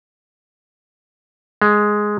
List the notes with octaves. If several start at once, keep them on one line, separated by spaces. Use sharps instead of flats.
G#3